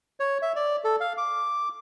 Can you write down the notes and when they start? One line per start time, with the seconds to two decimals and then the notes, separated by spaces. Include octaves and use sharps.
0.20 C#5
0.42 E5
0.56 D5
0.84 A4
1.01 F5
1.18 D6